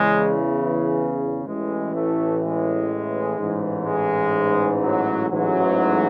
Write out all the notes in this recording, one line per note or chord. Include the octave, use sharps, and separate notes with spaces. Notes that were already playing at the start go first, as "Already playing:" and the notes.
Already playing: E2 C#3 E3 G#3
A1 A2 E3 G#3
A3
G#3
A1 G#2 E3
G#3
F#3
A1 G#2 E3 F#3